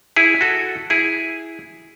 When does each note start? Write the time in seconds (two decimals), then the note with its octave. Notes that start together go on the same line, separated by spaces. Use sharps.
0.16 E4 G#4
0.41 F#4 A4
0.90 E4 G#4